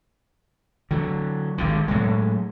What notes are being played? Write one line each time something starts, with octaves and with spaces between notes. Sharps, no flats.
D3 F#3
G#1 G2 D3
A2 F#3 G#3